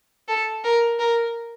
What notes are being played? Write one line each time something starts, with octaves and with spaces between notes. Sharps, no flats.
A4
A#4
A#4